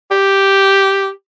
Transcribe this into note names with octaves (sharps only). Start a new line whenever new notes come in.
G4